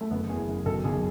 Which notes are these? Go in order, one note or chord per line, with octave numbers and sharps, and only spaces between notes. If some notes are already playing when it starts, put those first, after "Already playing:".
A3
F#1 B3
E2 G#4
F#1
B1 A4
B1 G#4